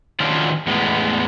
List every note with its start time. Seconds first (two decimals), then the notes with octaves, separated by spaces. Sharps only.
0.20 D#3 F3 F#3 C#4 D4 F4
0.67 E2 A2 G#3 A3 B3